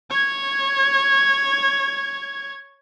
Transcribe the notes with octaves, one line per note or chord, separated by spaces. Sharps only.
C#5 G#6